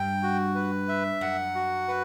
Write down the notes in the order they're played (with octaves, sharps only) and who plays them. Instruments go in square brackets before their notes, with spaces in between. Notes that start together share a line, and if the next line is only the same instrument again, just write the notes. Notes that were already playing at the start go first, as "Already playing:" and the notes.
Already playing: [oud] G2 [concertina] G5
[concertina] F#4
B4
E5
[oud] F#2 [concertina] F#5
[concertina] F#4
B4